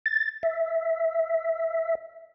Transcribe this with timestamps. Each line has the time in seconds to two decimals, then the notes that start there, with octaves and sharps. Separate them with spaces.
0.06 A6
0.43 E5